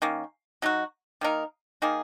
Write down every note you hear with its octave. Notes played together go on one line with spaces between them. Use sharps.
D#3 A#3 C#4
F#3 D#4 F#4
D#3 A#3 D#4 A#4
D#3 A#3 D#4 G#4